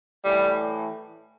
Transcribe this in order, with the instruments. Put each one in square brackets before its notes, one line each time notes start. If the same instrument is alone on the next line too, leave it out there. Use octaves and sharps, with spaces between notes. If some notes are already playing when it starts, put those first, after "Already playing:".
[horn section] A2 E3 G3